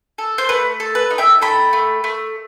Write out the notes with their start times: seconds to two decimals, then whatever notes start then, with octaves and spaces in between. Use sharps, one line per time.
0.18 A4
0.38 C5
0.49 A3 B4
0.80 A4
0.95 B4
1.11 D#4
1.18 E5 G5
1.42 A4 G5 B5
1.73 A3
2.04 A3